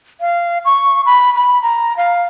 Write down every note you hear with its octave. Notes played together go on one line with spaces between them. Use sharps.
F5
C#6
B5
B5
A#5
F5